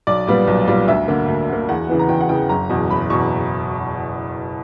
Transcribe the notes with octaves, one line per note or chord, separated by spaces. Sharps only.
B1 D5
A#2 G3 B3
B1
A#2 G3 B3
D2 E5
D3 A#3
D2
D3 A#3
E2 F#5
C#3 E3 B3
A#5
E2 G5
F#5
C#3 E3 B3 G5
F#1 A#5
E2 B2
F#1 B5
E2 B2 C#6